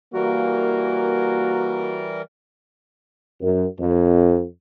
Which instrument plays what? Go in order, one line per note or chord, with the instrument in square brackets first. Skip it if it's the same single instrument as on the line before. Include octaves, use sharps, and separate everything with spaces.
[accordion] E3 G3 A#4 [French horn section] A#3 [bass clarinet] F#4
[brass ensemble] F#2
F2